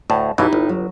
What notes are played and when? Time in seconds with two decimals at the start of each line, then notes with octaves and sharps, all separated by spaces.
0.10 D2 A2 A5
0.38 B1 B2 E3 D#4 E4 G4
0.53 G1
0.69 F#3